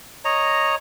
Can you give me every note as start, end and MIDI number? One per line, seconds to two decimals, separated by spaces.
0.25 0.75 73
0.25 0.75 75
0.25 0.75 82